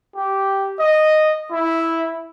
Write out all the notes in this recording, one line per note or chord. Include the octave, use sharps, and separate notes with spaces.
G4
D#5
E4